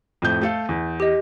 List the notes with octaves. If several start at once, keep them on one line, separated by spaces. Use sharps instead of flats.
F2 A2 G6
A3 A4 F5
E2
G4 D#5